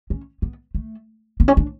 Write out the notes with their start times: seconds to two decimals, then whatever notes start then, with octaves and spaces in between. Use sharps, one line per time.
0.10 C#4
0.42 B3
0.75 A3
1.40 B3
1.48 C#4
1.57 D4